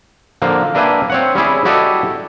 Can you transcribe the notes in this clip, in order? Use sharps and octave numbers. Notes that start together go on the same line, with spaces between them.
D3 F3 A#3
A#3 D4 B4 E5 G5 G#5
C4 C#5 F#5
G3 C#4 E4 G#4
E4 F#4 G4 A4 D5 D#5